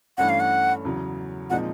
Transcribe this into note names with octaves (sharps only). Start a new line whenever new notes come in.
G2 E3 A3 C#4 F#5
F5
F#5
E2 C#3 F#3
A#2 F3 G#3 C4 D#4 F#5